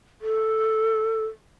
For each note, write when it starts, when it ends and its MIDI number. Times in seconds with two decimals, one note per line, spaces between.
0.21 1.25 69